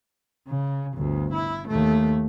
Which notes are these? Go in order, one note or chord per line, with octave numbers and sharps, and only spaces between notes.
C#3
G1 D2
E4
D#2 A3